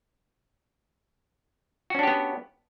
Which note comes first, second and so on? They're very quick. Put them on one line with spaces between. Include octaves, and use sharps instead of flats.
F#4 C#4 D4 G4 B3